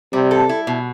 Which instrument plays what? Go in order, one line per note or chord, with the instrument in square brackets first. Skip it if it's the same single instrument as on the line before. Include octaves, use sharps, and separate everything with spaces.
[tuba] C3 [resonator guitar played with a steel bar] G3
[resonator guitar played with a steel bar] A4
E4
B2